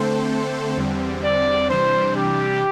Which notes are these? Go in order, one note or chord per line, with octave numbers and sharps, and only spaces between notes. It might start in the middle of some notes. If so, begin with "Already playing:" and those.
Already playing: D3 A3 C4 A4 C5
E2 D3 G3 C4
D5
C3 E3 G3 D4 C5
G4